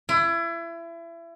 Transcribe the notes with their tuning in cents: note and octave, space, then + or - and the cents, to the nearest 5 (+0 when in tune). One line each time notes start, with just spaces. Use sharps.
E4 +30